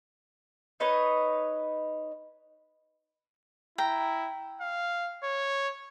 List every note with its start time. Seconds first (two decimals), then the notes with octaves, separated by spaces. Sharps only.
0.80 D#4 B4 C#5 D#5
3.78 E4 G5 A#5
4.61 F5
5.24 C#5